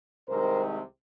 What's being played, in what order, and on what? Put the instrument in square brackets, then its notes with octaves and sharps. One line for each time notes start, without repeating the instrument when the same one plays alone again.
[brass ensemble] C2 C3 D#3 G#3 A#4 C5